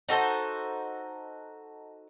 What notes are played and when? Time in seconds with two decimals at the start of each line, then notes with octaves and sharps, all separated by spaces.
0.09 D#4 F#4 A4 C5